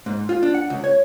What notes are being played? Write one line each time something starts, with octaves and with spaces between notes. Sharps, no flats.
G#2
F4
D4
F#5
C#2
C#5